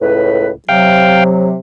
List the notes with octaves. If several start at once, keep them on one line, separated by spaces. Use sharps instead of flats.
C#2 A2 B4
C3 F#3 F5 G5